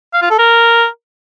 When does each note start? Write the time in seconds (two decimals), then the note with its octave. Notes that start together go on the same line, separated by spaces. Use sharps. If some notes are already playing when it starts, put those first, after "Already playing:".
0.13 F5
0.22 F4
0.30 A4
0.39 A#4